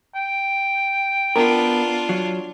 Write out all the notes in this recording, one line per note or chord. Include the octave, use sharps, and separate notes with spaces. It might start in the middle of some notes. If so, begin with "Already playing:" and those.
G5
B3 D4 F4 A#4
F#3